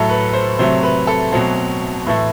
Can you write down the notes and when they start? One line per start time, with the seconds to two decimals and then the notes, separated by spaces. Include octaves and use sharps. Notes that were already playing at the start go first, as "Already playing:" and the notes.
Already playing: A2 F#3 A3 A4
0.09 B4
0.33 C5
0.59 C3 F#3 A3 C5
0.83 B4
1.07 A4
1.32 B2 F#3 A3 C4
2.07 A2 E3 A3